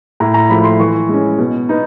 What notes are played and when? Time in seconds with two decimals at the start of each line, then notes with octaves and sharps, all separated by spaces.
0.20 A2 A#5
0.34 A#5
0.50 F3 A3 B5
0.64 C6
0.79 E3 C#6
1.09 G#3 C#4
1.38 B2
1.69 B3 D#4